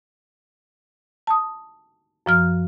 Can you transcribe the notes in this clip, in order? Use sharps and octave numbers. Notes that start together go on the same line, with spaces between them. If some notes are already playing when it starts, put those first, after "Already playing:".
A5 D#6
F#2 F3 F6